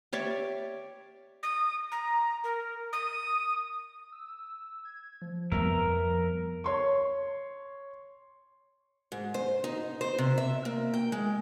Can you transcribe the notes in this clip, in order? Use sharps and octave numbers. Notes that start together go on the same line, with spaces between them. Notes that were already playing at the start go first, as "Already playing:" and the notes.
G4 C#5 D5 E5
D#6
A#5
A#4
D#6
E6
G#6
F3
F2 G3 B3 A#4 E5
C#5 C6 C#6
G#2
C5
D#4
C5
C3
E5
A#3
G5
G#3